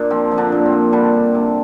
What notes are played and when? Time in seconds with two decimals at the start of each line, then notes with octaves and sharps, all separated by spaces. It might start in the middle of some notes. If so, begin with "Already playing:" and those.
Already playing: A#2 A#3 D4
0.10 F3 C4
0.31 F3
0.37 D3 D4
0.52 A#2
0.65 C4
0.72 A#2
0.92 D3 G3 D4
1.13 G3
1.34 C3